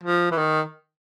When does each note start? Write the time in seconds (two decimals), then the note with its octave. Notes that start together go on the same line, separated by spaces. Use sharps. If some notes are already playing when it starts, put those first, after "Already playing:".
0.03 F3
0.31 E3
0.37 D#3